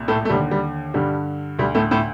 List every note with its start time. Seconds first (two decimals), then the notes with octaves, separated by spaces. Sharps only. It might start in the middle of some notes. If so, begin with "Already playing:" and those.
Already playing: C2 A#2
0.08 A2 A3
0.25 A3
0.30 D#2 D3 G3
0.51 G3
0.94 G2 D3 G3
1.59 D2 D3 G3
1.75 A2 A3
1.91 A2 A3